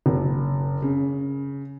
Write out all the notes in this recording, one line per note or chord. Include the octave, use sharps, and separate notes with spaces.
F#1
C#3